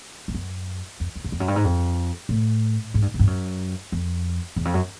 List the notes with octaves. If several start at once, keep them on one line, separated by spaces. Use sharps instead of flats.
G2
F#2
F2
F#2
E2
F2
F#2
G2
G#2
F2
A2
G#2
G2
G#2
G2
F#2
F2
E2
F2
F#2